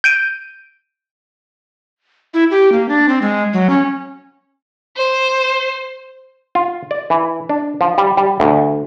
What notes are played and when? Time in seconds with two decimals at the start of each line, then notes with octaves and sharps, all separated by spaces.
0.04 G6 D7 D#7
2.34 E4
2.51 G4
2.72 A#3
2.89 D4
3.09 C4
3.22 G#3
3.53 F#3
3.70 C#4
4.97 C5
6.55 F4
6.91 D5
7.10 E3
7.49 D4
7.81 F3
7.98 G3
8.17 G3
8.40 D2